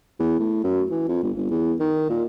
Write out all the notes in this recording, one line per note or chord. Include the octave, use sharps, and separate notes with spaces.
E2
A2
F#2
E3
F2
G1
G1
E2
D#3
A#2